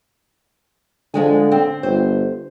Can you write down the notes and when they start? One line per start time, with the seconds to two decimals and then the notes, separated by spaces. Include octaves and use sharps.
1.14 D3 F3 G#3 G#5
1.52 C4
1.83 G1 C5